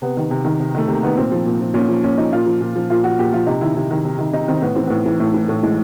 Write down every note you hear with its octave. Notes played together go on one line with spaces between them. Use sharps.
C3 B3
D#3
C3
D#3
C3
D#3 A3
C3 A#3
D#3 B3
A#2 C4
F3
A#2
F3
A#2 C#4
F3
A#2 C#4
F3 D#4
A#2 F4
F3
A#2
F3
A#2 F4
F3 F#4
A#2 G4
F3 F4
C3 D#4
D#3 E4
C3 E4
D#3
C3
D#3
C3 D#4
D#3 C4
A2 B3
E3 C4
A2 B3
E3
A2 A3
E3
A2 A3
E3 G#3